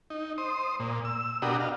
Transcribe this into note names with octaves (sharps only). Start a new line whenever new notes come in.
D#4
C5 D#6
A#2
E6
B2 D4 F#4 G4 A#4 D#6
D#5 F5